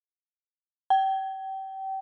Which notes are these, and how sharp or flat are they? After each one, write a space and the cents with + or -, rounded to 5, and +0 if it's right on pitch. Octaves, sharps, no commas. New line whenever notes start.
G5 -30